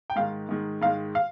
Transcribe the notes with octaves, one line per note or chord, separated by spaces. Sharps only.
G5
G#2 D#3 G#3 F5
G#2 D#3 G#3
G#2 D#3 G#3 F5
F5